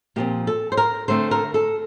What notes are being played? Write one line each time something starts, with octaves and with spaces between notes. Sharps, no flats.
A#2 F3 C4 G4
A4
C5
A#4
D3 A3 C4 C5
A#4
A4